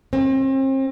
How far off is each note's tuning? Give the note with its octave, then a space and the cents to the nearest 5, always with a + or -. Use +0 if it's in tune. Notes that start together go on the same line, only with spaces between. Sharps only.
C4 +40